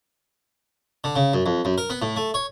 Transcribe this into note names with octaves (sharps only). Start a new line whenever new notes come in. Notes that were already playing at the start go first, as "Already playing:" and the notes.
D3
C#3
F#2
F2
F#2
A#4
B3
A2
A3
C#5